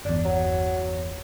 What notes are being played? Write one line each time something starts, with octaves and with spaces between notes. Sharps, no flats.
G1 E2 D4
F#3